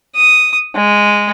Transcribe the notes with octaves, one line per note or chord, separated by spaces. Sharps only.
D#6
G#3